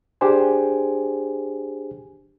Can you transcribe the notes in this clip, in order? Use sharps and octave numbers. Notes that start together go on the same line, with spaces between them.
D4 G4 G#4 C5 G#5